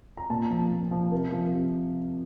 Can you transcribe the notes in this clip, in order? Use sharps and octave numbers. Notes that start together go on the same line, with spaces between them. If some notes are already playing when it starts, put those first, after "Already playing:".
A#5
A#2 A5
F3
A#2
F3
C3 A#4
F3
C3